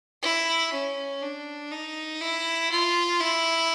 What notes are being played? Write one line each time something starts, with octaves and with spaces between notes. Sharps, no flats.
E4
C#4
D4
D#4
E4
F4
E4